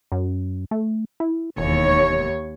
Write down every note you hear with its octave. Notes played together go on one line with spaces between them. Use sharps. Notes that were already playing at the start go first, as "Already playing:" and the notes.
F#2
A3
E4
E1 D#2 C#5